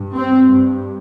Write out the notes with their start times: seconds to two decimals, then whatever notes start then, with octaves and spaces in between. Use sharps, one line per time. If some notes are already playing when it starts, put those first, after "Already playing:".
Already playing: G2
0.15 C4
0.46 G2